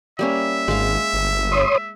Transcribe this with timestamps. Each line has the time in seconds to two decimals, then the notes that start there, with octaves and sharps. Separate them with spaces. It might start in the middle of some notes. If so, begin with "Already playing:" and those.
0.19 G3 A#3 C#4 E5
0.68 G#1 G#3 F5
1.13 G1
1.52 C#5 C6 D#6